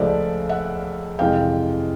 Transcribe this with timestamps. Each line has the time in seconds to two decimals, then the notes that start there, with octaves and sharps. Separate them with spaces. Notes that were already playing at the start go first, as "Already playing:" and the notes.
Already playing: C#2 C#3 F3 A3 D5 E5
0.49 E5 F#5
1.19 F2 C3 E3 G#3 F5 G5